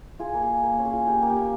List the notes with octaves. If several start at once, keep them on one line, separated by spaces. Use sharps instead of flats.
F4 G#4
A#3
G#4
A#3
A#3
C#4
G#4
F4
A#3 G4
A#3
G4
A#3